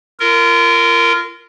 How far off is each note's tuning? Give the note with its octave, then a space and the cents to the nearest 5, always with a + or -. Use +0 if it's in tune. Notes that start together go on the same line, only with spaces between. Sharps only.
F4 -35 A#4 -10